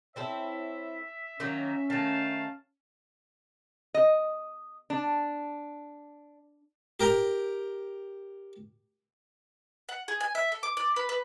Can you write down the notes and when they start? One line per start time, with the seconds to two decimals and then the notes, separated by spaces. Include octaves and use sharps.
0.16 C4 E4 A4 C#5 E5
1.40 D#3 F#3 A#3 C#4
1.90 D#3 A3 F5 A5
3.94 D#5
4.90 D4
7.00 G4 A#4 G5 A#5
9.89 F#5
10.08 G#4
10.21 G#5
10.35 E5
10.52 A4
10.63 D6
10.77 D5
10.96 B4
11.09 B4